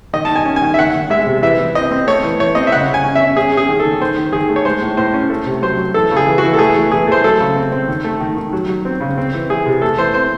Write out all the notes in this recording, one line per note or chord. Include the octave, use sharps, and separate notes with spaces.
D#3 D#5
A5
D#3
G#5
C#4
G#5
D#3
E5
D#3 F#5
D#3
G#3 E5
C3
E3 E5
E3
C4 D#5
C4
A3 C#5
E3
E3 C#5
C4 D#5
E5
C#3 F#5
C#3
G#5
C#4
C#4 E5
C#4 G#4
C#4 G#4
D#3
A4
D#3
D#3 C5
D#3
D#3 G#4
A3
C#5
G#3 C5
A2
A2 C5
C#4
A3
C3
F#3 C5
F#3
E3 A4
C#3
G#4
E3
F#4
E3
A4
A3 G#4
E3
E3 G#4
A3 C5
F#3 A4
C#3
C4
C4
D#3
A3
D#3
D#3
F#3
F#3
C4
C#3
C4
E3
E3 G#4
C3
A3 A4
E3 C5
C4 C5